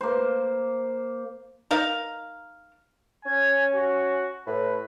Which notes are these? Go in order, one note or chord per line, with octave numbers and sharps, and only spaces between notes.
A#3 C5
D#4 A#4 F5
C#4 G#5
F#4
A2 B4